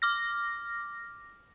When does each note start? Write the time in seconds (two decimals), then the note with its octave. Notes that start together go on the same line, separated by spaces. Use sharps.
0.02 D6 F6 A#6